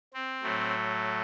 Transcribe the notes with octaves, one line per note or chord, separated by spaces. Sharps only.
C4
A2 F#3 A3